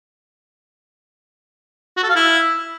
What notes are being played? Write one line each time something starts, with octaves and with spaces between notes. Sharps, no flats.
F#4
A4
F5
E4